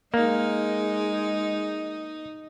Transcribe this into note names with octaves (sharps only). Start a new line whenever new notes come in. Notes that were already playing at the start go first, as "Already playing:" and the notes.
G#3 A#3 D#4